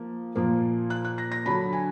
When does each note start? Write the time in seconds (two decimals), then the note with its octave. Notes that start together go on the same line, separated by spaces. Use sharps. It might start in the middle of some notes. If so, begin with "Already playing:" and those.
Already playing: F3 A#3
0.36 A#2 F3 A#3
0.90 F#6
1.05 F#6
1.18 A#6
1.32 A#6
1.46 D3 F#3 D4 B5
1.73 G#5